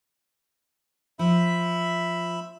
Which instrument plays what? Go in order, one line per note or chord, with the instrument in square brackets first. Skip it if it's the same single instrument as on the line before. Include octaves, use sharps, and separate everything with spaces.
[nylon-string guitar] F3 [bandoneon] E5 B5